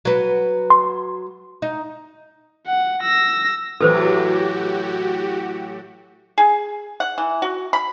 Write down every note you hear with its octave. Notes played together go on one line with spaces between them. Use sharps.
F#3 B4
C6
D#4
F#5
E6 A#6
A2 E3 F#3 F#4 G4 A4 B4 C5
G#4
F#5
E3
F#4
B5